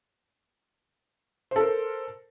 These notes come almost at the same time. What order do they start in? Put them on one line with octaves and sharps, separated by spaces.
C5 A4 A#4